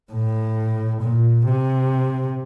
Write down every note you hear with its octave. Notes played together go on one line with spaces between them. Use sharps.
A2
A#2
C3